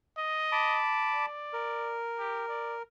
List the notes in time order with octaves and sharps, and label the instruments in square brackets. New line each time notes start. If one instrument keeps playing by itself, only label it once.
[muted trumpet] D#5
[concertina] A5 B5 D6
[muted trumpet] D5
[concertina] A#4
[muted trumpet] G4
D5